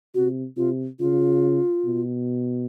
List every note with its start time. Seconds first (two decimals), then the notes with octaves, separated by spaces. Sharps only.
0.15 C3 F#4
0.57 C3 F4
0.99 C#3 F4
1.85 B2